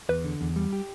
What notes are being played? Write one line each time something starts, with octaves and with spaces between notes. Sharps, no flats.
E2 B4
D3
E2
G3
G4